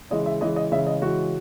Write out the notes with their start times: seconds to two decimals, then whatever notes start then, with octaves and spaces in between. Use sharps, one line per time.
0.10 C#3 E3 G#3 D#5
0.26 E5
0.41 C#3 E3 G#3 D#5
0.56 D#5
0.72 C#3 E3 G#3 E5
0.87 D#5
1.02 C#3 E3 G#3 F#4